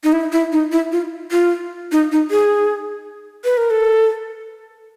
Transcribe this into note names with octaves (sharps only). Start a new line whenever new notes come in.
D#4
E4
E4
D#4
E4
F4
F4
D#4
D#4
G#4
B4
A#4
A4